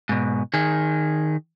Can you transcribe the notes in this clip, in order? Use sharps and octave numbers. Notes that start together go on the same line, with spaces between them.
G#2 B2
D#3 G#4